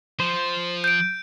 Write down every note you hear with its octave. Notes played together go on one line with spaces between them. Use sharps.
F3 C5
G6 D7